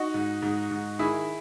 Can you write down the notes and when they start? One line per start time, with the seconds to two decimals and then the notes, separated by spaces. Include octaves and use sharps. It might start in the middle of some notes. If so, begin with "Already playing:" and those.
Already playing: D#4 F#4
0.14 G#2
0.42 G#2
0.71 G#2
0.99 D#3 E4 G#4